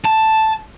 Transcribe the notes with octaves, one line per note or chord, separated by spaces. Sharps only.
A5